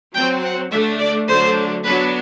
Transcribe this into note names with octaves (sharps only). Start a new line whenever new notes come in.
F#3 C4 G5
F#5
D3 A3 D4 E5
D5
D3 F#3 A3 D4 C5
F#3 B3 D4 B4